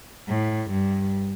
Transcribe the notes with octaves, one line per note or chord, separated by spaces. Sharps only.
A2
G2